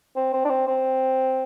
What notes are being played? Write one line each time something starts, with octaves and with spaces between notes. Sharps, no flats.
C4
C4
D4
C4
C4